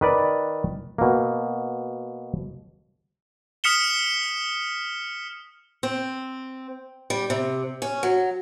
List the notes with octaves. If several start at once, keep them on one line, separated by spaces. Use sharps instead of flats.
D#3 B4 D5
B2 A#3
D#6 F6 B6 C#7 E7 G7
C4
G3
C3
C#4
F#3